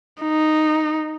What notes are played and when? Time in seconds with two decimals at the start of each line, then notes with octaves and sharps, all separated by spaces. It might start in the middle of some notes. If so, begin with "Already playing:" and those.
0.22 D#4